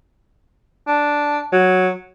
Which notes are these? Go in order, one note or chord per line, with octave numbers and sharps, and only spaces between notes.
D4
F#3